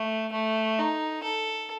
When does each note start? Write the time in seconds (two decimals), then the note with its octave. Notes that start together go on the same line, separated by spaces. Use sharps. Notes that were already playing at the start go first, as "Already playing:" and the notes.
Already playing: A3
0.32 A3
0.78 D#4
1.23 A4